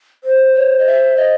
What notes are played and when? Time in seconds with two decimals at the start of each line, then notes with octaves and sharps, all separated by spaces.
0.24 C5
0.55 C#5
0.79 D#5
0.86 E5
1.17 D#5